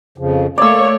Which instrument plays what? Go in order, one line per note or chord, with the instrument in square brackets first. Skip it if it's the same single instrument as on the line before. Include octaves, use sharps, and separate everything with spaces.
[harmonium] F2 C#3 F3
[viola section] A3 C#5 [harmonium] A#3 [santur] D5 E6